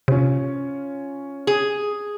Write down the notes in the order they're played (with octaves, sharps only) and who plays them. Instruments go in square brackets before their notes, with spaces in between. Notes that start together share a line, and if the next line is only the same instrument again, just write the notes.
[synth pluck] C3 [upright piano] C#4 F4 C#5
[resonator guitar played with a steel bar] G#4